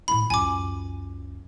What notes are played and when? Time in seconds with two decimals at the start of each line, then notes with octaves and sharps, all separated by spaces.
0.08 A2 E4 B5
0.30 C#2 F#2 G#5 D6